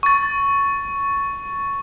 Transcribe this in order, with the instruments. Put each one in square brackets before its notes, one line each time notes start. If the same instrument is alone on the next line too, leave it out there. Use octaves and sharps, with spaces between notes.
[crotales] C#6 A6